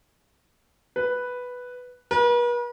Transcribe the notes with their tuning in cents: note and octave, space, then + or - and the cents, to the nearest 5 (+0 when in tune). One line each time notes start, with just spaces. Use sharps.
B4 +0
B4 -45